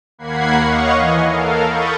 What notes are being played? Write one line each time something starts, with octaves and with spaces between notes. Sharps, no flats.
D#2 A#3 F#5 B5 G#6 C7
C#5 D#5 F5 F#5 C#6
E3 D#5 G#5
A4 A#4 F5
B5 C#6 D#6 G6 A6